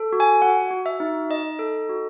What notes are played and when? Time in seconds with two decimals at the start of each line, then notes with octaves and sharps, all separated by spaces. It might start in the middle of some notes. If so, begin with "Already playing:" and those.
Already playing: A4
0.12 F#4
0.20 G#5
0.42 F#4 F#5
0.71 F#4
0.86 E5
1.00 D#4
1.30 D#4 D#5
1.59 A4
1.89 F#4